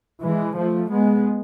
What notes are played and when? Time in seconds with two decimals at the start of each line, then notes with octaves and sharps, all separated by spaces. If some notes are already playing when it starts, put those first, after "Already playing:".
0.25 E3 G#3
0.58 F3 A3
0.92 G#3 B3